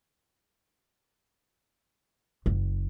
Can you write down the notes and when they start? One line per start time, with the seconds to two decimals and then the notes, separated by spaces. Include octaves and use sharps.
2.46 F#1